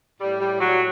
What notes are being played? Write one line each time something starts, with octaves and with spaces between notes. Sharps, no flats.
A2 G3
G3
F#3